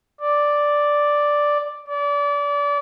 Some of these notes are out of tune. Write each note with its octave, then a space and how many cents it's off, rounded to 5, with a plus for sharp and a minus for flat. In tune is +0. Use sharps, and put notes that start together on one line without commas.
D5 +0
D5 -30